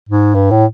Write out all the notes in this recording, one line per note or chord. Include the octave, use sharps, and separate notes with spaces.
G#2
G2
A2